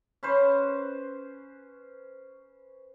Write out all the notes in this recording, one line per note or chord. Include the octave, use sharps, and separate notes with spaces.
C#4 B4 C5